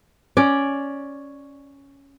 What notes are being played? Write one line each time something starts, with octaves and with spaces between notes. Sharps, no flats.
C#4 D5